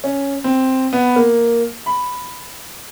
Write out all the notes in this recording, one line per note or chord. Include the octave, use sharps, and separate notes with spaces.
C#4
C4
B3
A#3
B5